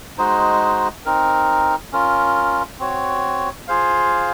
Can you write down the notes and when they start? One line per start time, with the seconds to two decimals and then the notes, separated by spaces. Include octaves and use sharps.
0.18 G#3 D#4 F#4 C5 D#5
1.05 C4 D#4 A#4
1.93 C#4 F4 A#4
2.79 C4 F#4 C#5
3.68 F4 G#4 C5 F5